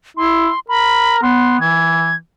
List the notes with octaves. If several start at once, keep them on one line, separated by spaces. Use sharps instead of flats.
E4 C6
A#4 B5
B3 C6
E3 G#6